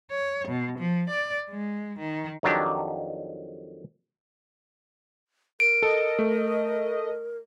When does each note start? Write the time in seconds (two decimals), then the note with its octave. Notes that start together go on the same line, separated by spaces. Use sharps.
0.11 C#5
0.48 B2
0.79 F3
1.09 D5
1.50 G#3
1.99 D#3
2.43 F2 D#3 F#3 D4 G4
5.60 A#4 D7
5.83 A4 D#5
6.19 A3